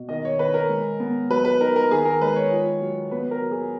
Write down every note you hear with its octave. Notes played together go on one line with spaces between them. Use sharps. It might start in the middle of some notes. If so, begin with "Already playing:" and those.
Already playing: B2
D#3 D#5
C#5
D#3 B4
A#4
G#3
B3
F#3 B4
B4
D#4 A#4
A#4
D#3 G#4
A#4
G#3 B4
C#5
F4
F#3
B3 B4
A#4
F#3
G#4